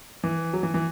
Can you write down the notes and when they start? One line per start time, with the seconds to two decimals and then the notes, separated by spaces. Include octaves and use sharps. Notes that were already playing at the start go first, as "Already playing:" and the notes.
0.23 E3
0.53 F#3
0.63 E3
0.74 E3